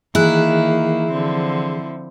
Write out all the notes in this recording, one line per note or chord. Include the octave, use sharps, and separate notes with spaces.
D#3 E3 A#3 E4 G#4 F#6
D3 F3 C4